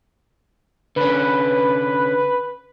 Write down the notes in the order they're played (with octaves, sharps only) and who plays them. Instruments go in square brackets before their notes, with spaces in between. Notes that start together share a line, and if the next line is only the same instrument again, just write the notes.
[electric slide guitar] D3 C#4 [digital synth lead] B4